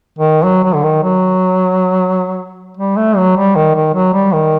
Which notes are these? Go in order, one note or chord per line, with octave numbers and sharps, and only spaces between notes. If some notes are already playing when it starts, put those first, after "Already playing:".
D#3
F#3
F#3
D3
D#3
F#3
G3
A3
F#3
G3
D#3
D#3
F#3
G3
D#3